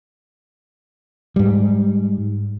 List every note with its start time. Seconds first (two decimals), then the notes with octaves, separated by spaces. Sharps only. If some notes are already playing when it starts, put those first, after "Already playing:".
1.36 G#2 G3